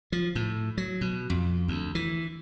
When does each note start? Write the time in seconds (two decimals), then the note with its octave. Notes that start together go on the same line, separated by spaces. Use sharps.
0.12 F3
0.35 A2
0.77 F#3
1.01 B2
1.30 F2
1.68 D2
1.95 E3